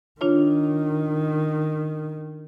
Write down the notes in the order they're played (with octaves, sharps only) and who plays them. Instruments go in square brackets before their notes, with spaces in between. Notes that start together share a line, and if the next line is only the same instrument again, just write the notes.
[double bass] D#3 [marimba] D4 F4 C#5